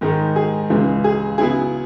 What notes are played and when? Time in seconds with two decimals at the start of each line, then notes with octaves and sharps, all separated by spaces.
0.01 G#2 D#3 G#3 D#4
0.36 G#4
0.70 C#2 C#3 E3 G#3
1.04 G#4
1.38 C#3 F#3 B3 E4 G#4